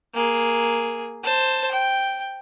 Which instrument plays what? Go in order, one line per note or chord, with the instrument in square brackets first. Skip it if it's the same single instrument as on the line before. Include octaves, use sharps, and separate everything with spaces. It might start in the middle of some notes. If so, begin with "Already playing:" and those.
[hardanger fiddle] A#3 G#4
C5 A5
G5